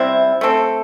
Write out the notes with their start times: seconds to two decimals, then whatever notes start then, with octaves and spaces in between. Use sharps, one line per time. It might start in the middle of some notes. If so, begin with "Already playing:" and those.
Already playing: C3 G3 C4 E4
0.41 A3 C4 A4